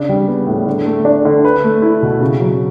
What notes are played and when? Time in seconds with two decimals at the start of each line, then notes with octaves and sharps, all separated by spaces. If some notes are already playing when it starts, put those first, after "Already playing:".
Already playing: C#3 D4
0.09 G3
0.28 B3
0.47 A2
0.66 D3
0.86 A3
1.05 D4
1.25 D3
1.45 B4
1.64 A3
1.82 E4
2.03 B2
2.21 C#3
2.40 F#3